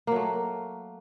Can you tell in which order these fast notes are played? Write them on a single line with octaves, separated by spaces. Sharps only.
A#3 F#3 A3